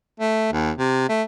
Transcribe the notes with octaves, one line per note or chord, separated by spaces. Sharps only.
A3
D#2
C3
A3